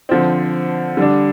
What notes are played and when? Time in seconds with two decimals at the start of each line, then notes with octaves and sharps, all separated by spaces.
0.09 D3 F3 C4
0.97 D3 G3 D4